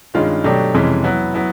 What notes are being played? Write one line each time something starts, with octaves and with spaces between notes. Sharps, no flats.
G2 D#3 G#3 C#4 F4
B2 F#3 A3 D4 G4
F2 C3 E3 G#3 C#4
F#3 B3 E4
F#3 B3 E4